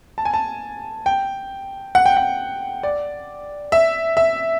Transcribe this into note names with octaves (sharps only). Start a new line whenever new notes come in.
A5
G#5
A5
G5
F#5
G5
F#5
D5
E5
E5